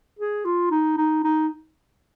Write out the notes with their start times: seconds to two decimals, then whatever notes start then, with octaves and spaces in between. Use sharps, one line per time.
0.19 G#4
0.45 F4
0.71 D#4
0.97 D#4
1.24 D#4